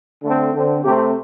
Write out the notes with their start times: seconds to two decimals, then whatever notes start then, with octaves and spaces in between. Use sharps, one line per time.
0.22 D3 A3 C4
0.53 D3 C4
0.83 C3 A3 C4 G4